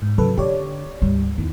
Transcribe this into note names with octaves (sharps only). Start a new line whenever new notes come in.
G#2
C#3 F#3 A4 B4
D3 G4 C#5 D5
D2 G#2 G3
E2 D#3